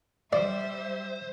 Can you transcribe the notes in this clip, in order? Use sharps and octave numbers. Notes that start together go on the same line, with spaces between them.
G3 C5 D5 E5